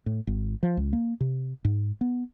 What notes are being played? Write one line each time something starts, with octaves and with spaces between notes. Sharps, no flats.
A2
G#1
F3
C#2
A#3
C3
G#2
B3